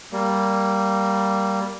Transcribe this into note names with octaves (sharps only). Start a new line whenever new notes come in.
G3 A#3